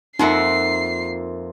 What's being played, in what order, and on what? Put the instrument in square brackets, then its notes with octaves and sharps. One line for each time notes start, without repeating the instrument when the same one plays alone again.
[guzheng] F2 A#3 F#5 [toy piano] D#4 [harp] F4 A#4 E5 [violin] C7